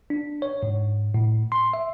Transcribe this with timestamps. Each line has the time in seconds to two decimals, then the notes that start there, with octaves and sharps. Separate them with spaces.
0.10 D4
0.42 C#5
0.63 G#2
1.14 A2
1.52 C6
1.73 E5